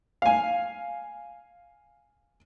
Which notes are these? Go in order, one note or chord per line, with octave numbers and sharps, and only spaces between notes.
F5 G#5